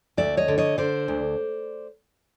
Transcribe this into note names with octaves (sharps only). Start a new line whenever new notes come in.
D2 D5 E5
C#5 D#5
D3
C#5 D#5
D3 C5 D5
D2